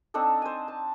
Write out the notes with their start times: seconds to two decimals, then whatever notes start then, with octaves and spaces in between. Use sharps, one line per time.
0.14 C4 D4 D#4 A4
0.42 C5 G#5
0.68 A5